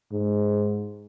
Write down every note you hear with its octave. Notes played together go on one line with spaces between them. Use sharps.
G#2